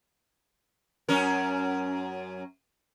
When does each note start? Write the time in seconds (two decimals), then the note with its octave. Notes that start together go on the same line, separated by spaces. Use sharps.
1.09 F#2 C#4 A#4